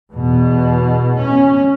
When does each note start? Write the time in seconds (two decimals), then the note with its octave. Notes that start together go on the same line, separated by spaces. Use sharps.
0.14 E2 B2
1.18 C#4